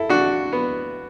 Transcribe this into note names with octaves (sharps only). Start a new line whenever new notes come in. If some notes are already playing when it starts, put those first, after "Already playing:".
Already playing: E4 A4
D4 F#4
B3